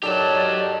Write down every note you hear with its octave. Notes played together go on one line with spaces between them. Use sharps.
D#3 F#3 G4 A4 D5 A5